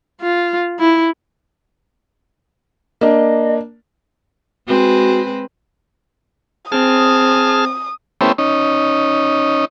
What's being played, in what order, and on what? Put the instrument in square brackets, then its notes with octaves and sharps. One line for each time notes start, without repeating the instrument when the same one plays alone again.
[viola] F4
E4
[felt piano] A#3 D4 [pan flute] D#5
[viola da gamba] G#3 C4 B4 [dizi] F#4
[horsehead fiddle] C4 [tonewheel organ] G#4 A5 F6 [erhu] D#6
[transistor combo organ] A3 B3 C#4 E4 G4 C5
C#4 D#4